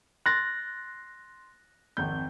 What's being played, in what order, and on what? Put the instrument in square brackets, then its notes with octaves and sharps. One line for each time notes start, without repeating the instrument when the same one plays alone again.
[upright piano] C6 A6 [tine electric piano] F#6 A#6
[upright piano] G#1 F2 G6